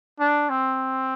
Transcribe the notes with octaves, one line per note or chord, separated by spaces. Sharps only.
D4
C4